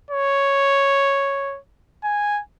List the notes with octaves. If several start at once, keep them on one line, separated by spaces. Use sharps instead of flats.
C#5
G#5